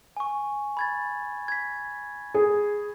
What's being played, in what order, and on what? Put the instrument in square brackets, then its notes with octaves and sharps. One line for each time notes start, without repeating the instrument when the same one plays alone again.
[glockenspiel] G#5 C#6
B5 G#6 A6
G#6 B6
[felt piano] G#4